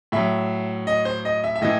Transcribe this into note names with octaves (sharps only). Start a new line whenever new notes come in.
A2 F#3 E5
D#5
C5
D#5
E5
E5
A2 E3 D#5